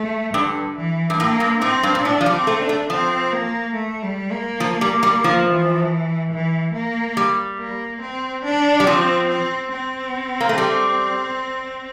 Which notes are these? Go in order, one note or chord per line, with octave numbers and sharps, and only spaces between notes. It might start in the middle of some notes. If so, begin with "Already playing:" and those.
Already playing: A3
G2 D3
E3
G2
A2 A#3
G2
A2 C4
G2
A#2
A2 D4
F3
G3
C4
A3
D4
A3
F3 C4
A#3
A3
G3
A#3
F3
G3
G3
F3
E3
E3
A#3
G3
A#3
C4
D4
G3
F3 C4
C4
C4
A#3
A3
G3